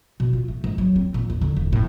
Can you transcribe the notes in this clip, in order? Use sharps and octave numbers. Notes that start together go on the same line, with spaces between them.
B2
F4
A3
G#2
F#3
C4
A#2
D#2
D3
E1
A2